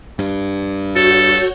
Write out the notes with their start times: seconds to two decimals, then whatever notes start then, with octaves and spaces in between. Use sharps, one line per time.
0.19 G2
0.96 F#4 A4 C#5 G6